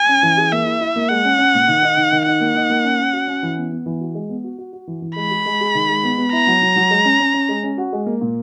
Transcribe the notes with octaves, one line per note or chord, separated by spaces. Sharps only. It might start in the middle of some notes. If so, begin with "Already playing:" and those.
Already playing: G#5
C#4
E3
G#4
A#3 E5
E4
E4
A#3
G#3 F#5
C#4
C#4
A#2
D#3
D#4
D#3
D#3
D#4 F#5
A#3
D#4
A#3
C#4
C#4
F#4
C#4
E3
B3
B3
E3
F#4
G#3
B3
F#4
F#4
F#4
E3
E3
G#3 B5
G#4
G#3
G#4
D#3
G#3
B3
B3
E4 A#5
F#3
F#3
F#3
G#3
C#4
C#4
C#4
G#3
C#4
F#4
G#3
A#3
A#2